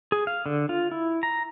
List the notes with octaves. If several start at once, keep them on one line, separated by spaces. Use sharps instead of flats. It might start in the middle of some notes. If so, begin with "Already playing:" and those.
G#4
F5
D3
F4
E4
A#5